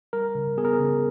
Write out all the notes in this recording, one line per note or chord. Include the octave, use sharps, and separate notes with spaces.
G3 A#4
C#3
B3 G#4
A#4
G#4
C#3